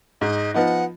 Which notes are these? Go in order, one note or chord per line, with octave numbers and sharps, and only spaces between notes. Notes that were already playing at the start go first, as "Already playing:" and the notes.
G#2 D#5
F3 B3 D#4 F#5